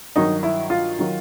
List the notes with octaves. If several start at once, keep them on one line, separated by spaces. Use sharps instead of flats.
G2 D#3 F#3 D#4
E4
F4
D#3 F#3